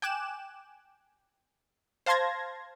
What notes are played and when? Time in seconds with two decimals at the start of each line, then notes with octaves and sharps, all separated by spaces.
0.02 G5 G#5 D6 F#6 E7
2.06 C5 F5 A5 C6 G#6 A#6